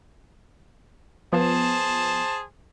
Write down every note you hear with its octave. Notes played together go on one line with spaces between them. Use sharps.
F3 B3 G#4 C5 A5